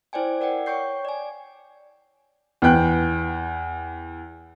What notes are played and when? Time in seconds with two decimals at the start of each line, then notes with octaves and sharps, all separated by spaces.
0.13 E4 C5 D5 G5 G#5
0.41 A#4 D5 F#5 G5
0.66 C#5 G5 C#6 G6 C7
1.05 D5 G#5
2.62 E2 B4 G5 F#6